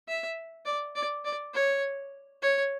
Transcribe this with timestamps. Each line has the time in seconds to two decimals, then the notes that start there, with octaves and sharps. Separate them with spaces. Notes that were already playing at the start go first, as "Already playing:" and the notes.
0.08 E5
0.66 D5
0.95 D5
1.25 D5
1.54 C#5
2.42 C#5